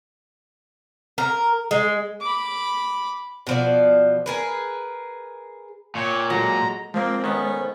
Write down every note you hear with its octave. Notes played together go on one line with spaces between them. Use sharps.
A#4
G#3
B5 D6
B2 F3 D5
G#4 A#4 B4
A#2 C#5 G5
F#3 G#3 A4 A#5
A#2 F3 G#3 A#3 C4 C5
D#3 A3 B3 C#4